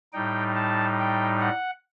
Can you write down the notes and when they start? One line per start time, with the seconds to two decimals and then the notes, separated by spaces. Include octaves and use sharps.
0.13 A2 G3 D#4 G5
0.55 A5
0.98 G5
1.41 F#5